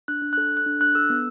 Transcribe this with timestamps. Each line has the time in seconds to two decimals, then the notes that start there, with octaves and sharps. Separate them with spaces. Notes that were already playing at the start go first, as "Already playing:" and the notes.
0.08 D4 F#6
0.22 D4
0.33 A4 F#6
0.52 A4 F#6
0.66 D4
0.80 D4 F#6
0.95 A4 E6
1.10 B3